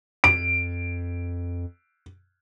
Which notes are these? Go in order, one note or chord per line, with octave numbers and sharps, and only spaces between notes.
F2 D7